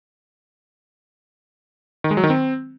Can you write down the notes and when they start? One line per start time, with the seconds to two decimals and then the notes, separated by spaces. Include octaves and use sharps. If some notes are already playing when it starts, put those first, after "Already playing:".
2.04 D#3
2.11 G#3
2.17 F#3
2.23 D#3
2.30 C4